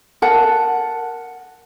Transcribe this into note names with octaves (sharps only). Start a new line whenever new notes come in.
A#4 F#5 A5